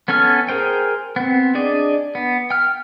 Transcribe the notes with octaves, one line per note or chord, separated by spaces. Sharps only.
B3 C#4 A4 G#5 F6
G#4 A#4 C5 G5
B3 C4
D4 G#4 D5 D#5
B3
G5 F6